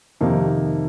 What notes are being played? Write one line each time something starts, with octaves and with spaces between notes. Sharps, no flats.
F2 C3 D#3 A#3 D#4